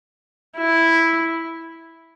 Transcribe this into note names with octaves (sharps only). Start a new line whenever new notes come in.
E4